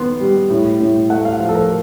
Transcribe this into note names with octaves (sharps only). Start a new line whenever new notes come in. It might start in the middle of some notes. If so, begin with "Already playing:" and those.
Already playing: D#3 B3 C6
G3
A2
A2
A3 F#5
F5
F3
A4
A#4